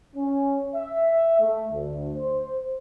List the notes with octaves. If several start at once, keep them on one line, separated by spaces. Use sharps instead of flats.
C#4
E5
A3
D2
C5